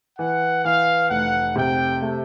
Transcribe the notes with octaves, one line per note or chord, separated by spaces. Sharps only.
E3 F#5
E3 F5
F1 F#5
C3 G5
A3